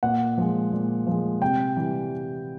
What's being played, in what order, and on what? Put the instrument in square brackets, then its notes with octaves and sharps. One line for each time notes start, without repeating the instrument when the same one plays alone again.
[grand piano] A#2 F#5
F3 G#3
A#2
F3 G#3
C3 G5
E3 G3